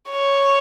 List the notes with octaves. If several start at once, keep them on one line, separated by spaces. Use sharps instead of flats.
C#5